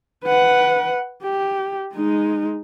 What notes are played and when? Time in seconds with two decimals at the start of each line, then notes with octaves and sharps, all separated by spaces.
0.25 B4 F#5
1.24 G4
1.95 G#3 D#4